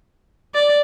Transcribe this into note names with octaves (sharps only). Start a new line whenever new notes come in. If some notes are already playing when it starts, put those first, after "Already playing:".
D5